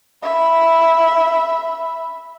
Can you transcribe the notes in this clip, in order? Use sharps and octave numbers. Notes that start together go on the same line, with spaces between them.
E5 B5